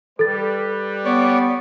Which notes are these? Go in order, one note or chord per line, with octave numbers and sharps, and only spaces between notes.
G3 A4 B4 A6
B3 C#5 D5